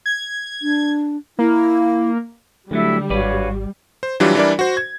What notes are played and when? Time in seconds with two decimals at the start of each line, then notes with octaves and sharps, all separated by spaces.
0.06 G#6
0.62 D4
1.39 A#3 E4
2.71 D2 D3 F#3 G3 A3 E4
3.10 G#1 G2 F#4 B4 C#5 D5 F5
4.03 C5
4.20 E3 F#3 G3 D4 F4 G4
4.35 E3 G3 D4 E4 A#4 D5
4.59 F#4 C5
4.77 G#6